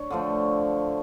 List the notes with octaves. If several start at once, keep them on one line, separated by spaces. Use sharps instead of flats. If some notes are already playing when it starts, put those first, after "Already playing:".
Already playing: D4 C#5
D3 F3 A3